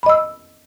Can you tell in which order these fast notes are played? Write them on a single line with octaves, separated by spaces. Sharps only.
B5 D#5 E6